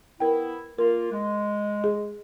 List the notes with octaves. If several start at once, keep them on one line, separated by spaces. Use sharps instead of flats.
B3 E4 A#4 G5
A#3 F4 A#4
G#3
G#4